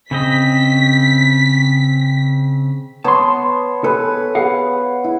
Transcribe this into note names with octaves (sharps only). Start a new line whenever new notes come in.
C#3 C4 D#5 B6
B3 C#5 A5 C6
A4 B4 G#5
G#4 F5 F#5
E4